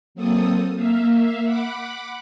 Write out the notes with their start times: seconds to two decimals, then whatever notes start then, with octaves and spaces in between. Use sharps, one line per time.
0.15 F#3 A#3 C4 A4 D#6
0.75 A#3 E5 F5
1.44 F#5 B5 D6